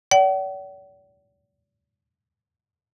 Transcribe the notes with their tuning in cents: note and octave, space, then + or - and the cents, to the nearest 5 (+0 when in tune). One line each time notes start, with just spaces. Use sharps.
D5 -45 F#5 +45